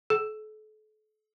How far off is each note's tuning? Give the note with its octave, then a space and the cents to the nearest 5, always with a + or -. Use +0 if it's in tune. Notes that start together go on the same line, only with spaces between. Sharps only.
A4 -40